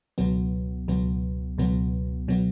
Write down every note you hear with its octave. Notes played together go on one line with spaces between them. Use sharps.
C#2 B2 F#3 B3
C#2 B2 F#3 B3
C#2 B2 F#3 B3
B2 F#3 B3